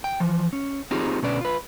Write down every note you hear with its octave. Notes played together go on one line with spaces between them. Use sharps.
G5
E3 F3
C#4
C4 D#4 F4 G4 G#4
B2 D3 C#4 B4 D5
F4 B4